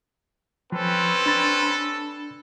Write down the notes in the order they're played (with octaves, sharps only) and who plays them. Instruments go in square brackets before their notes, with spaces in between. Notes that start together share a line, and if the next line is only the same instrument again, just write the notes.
[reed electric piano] F3 [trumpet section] C4 C#4 B4 [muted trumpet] A4
[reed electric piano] D4 B5 A6